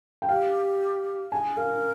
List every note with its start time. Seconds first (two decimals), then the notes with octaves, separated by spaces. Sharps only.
0.22 G5
0.29 G4 F5
1.32 G#4 G#5
1.57 A#4 F5